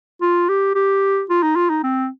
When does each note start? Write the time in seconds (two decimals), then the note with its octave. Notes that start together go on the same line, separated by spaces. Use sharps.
0.21 F4
0.49 G4
0.75 G4
1.29 F4
1.43 D#4
1.56 F4
1.70 D#4
1.83 C4